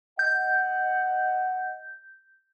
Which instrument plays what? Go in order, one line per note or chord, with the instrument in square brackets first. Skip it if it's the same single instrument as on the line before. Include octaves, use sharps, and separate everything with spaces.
[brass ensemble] D#5 F#5 [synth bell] G6